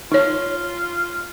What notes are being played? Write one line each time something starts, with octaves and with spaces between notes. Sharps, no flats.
D#4 F4 C#5